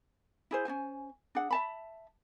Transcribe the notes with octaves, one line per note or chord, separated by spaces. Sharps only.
E4 G#4 C5
C#4 D4 C5 G#5
D4 G#4 F#5
E5 A5 B5